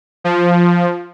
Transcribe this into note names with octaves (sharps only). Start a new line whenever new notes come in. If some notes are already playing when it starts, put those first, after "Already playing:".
F3